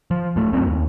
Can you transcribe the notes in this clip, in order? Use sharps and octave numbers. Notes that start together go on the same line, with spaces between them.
F3
D1 A2 A3
D1 G1 F#2 C4
D#2